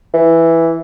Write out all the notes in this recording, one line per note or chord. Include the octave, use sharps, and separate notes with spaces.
E3